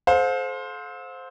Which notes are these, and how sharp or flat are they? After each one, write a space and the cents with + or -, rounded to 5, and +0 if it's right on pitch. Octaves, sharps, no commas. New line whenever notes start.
A4 -35 C5 +0 F5 +35